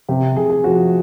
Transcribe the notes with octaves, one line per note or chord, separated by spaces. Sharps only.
C3 G4
C3 G#4
G#4
F3 F#4